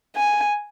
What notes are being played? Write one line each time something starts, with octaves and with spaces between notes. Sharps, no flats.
G#5